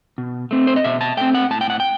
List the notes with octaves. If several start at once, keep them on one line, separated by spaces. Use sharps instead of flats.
B2
A3 C4
C5
D#5
B2 E5
A5
A3 C4 G5
F#5
A2 A5
G5
F#5
G5